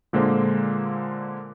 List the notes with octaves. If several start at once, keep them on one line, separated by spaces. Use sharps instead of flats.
A#2 D3 G#3 A#3 C5